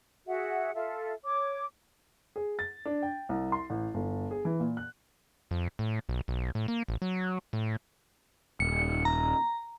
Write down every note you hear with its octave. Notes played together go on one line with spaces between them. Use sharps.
F#4 G#4 E5 F#5
F4 A4 E5 F5
C#5 D6
G#4
A6
D4
G5
C2
C6
A1
G1
G#4
E3
A#2
F#6
F2
A2
B1
B1
A2
A#3
A1
F#3
A2
D#1 C#7
A#5